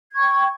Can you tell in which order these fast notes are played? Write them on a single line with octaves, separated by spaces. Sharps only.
G#6 C#6 G5